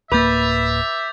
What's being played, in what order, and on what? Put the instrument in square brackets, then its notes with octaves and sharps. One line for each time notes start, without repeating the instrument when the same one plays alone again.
[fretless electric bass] D1 A#3 [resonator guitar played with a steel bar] B4 [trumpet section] E5 [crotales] D6 G6 A6